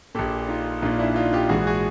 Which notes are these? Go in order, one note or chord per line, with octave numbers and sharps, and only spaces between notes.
A#1 A#2 G4 A4
D#4 F4
A#1 A#2 D#4 F4
D4 E4
D#4 F4
F4 G4
A#1 G#2 E3 F#4 G#4
F#4 G#4